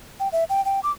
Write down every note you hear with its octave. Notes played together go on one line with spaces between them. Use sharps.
G5
E5
G5
G5
D6